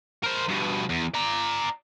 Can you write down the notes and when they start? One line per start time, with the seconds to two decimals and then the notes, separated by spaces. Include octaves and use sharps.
0.24 A#4 C5
0.49 G2 B2
0.89 E2
1.14 D5 A#5